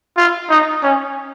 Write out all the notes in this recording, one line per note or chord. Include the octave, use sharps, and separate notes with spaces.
F4
D#4
C#4